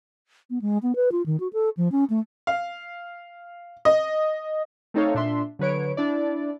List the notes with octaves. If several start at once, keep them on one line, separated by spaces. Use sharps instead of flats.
B3
G#3
B3
B4
F4
D#3
F#4
A4
F3
C#4
A3
F5
D#5
A3 C4 D#4 A4 C#5 F5
A#2 D4 E5 C6
D3 F#3 B4 C#5 D7
D4 E4 D5